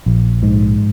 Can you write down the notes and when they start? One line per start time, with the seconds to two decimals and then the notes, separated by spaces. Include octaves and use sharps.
0.06 A#1
0.43 G#2